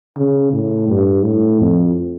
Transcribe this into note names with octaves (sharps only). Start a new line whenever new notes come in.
C#3
A2
G2
A2
F2